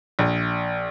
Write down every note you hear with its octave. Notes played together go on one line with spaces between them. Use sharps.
A#1